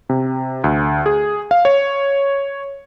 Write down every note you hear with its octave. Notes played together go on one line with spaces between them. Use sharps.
C3
D2
G#4
F5
C#5